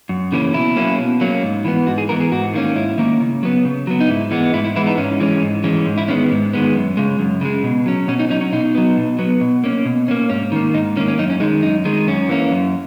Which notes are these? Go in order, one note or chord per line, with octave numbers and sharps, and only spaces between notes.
F#2
C#3 E3 A#3 C#4
B2 E4
F#3 A#3 C#4
B2
F#3 A#3 C#4
G#2
E3 B3
G#2 F#4
G#4
E3 B3 A#4
G#4
G#2 F#4
D#3 A#3 C#4
G#2 E4
D#3 A#3 C#4
C#3
F#3 B3
C#3
F#3 B3
D#4
G#2 E4
E3 G#3 B3
G#2 E4
E4
E3 G#3 B3 E4
D#4
G#2 C#4
E3 G#3 C#4
G#2
E3 G#3 C#4
G#2
E4
D#3 G#3 B3 C#4
G#2
D#3 G#3 B3
F#2
C#3 G#3
F#2
C#3 G#3
B2
F#3 C#4
B2 C#4
D#4
F#3 C#4 D#4
C#4
B2 D#4
F#3 B3
B2
F#3 B3
B2
A#3 C#4
B2
A#3 C#4
G#2 C#4
D#3 A#3
G#2 D#4
D#3 A#3 C#4
C#4
F#2 D#4
C#4
D#3 G#3 D#4
F#2 D#4
D#3 G#3
F#2 C#4
E3 A#3 C#4
F#2